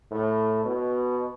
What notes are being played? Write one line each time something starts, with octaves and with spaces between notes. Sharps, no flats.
A2
B2